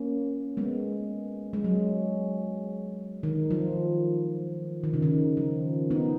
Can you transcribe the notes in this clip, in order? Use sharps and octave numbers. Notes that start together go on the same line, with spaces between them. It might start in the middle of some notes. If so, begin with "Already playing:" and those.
Already playing: A#3 C#4
G#3 B3
G#3
F#3
D#3
F3
D#3
C#3
D#3
F3
B3 D#4